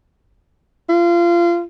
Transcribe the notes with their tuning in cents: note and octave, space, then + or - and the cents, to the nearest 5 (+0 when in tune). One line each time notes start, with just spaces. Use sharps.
F4 -25